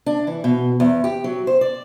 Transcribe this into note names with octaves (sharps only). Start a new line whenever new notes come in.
D4
E3
B2
E2
G4
F#3
C5
D5